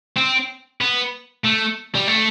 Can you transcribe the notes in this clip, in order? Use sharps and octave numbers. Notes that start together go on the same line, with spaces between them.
C4
B3
A3
G3
A3